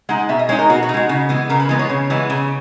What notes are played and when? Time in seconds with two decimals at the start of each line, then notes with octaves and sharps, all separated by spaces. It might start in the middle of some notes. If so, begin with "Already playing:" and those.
0.09 G#3 D#4 F#5
0.29 B2 E5
0.39 D#5
0.49 G#3 D#4 C#5
0.59 A#4
0.69 B2 F#4
0.83 F#4
0.89 D#4
0.94 G#3 F#4
1.09 C#3
1.29 E3 G#3 B3
1.49 C#3 A#4
1.60 B4
1.69 E3 G#3 B3
1.79 C#5
1.90 C#3
2.10 E3 G#3 B3
2.30 C#3